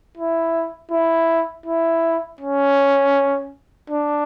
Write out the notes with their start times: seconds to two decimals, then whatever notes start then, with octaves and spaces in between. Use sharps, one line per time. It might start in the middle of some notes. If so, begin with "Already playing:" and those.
0.17 E4
0.91 E4
1.66 E4
2.41 C#4
3.90 D4